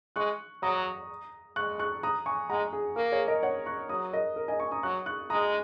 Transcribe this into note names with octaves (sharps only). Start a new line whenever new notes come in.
G#3 C#6 F#6
F#3 A#5 D#6
G#3 C#6 F#6
C#6 F#6
A#5 D#6
G#5 C#6
G#3 F#5 A#5
G#4
A#3 A#4
G#4 C#5
A#4 D#5
C#5 F#5
C#6 F#6
F#3 A#5 D#6
A#4 D#5
A#4
D#5 G#5
G#5 C#6
A#5 D#6
F#3 C#6 F#6
C#6 F#6
G#3 A#5 D#6